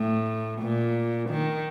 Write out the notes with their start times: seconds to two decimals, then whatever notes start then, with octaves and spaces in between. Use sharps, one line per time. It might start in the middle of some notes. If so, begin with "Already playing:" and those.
Already playing: A2
0.61 A#2
1.30 D#3